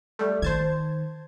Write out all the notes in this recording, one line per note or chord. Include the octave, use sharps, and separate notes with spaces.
G3 A3
D#3 C5 A5 G#6